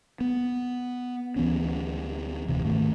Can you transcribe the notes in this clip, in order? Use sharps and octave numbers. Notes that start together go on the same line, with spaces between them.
B3
D2 E3 B3 C#4
E1 D#2 C3
G#2 D#3 A3